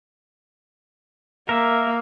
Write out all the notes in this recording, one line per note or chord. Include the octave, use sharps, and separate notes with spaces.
A#3 A#4 E5